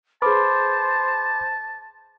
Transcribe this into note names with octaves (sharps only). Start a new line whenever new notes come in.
G#4 B4 C5 A5 B5 D6